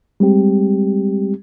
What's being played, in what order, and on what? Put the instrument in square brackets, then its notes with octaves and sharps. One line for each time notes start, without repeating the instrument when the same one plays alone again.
[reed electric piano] G3 G#3 C4 G4